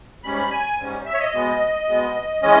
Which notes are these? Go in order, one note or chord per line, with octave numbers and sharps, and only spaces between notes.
G#2 G3 C#4 B5
G#5
G#2 G3 C#4
E5
C#5
D#5
B2 G#3 B3
B2 G#3 B3
E3 G#3 C#4 D#5